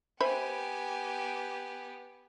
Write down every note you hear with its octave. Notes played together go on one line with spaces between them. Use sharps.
B3 G4 C5 E5 G5 G#5 B5